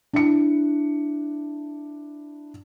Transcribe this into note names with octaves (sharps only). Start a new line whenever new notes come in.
D4 E4 C#7